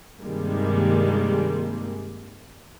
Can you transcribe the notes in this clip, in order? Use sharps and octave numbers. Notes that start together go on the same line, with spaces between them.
G2 C3 D#3 G3 G#3 A#3